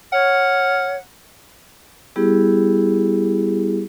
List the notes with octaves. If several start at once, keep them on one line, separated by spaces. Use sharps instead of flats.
C#5 F#5 F6
G3 B3 E4 G4 G#4